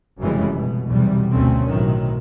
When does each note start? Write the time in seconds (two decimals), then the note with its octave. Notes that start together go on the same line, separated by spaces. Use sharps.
0.19 F1 F#2 C#3 E3 G3 G#3
0.55 B2
0.87 B1 E2 C3 G3
1.32 G1 D2 B2 A3 C4 C#4
1.67 B1 A2 C3 D#3 F#3